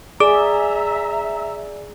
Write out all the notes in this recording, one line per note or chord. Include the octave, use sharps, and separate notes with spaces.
G#4 D5 E5 A#5 D6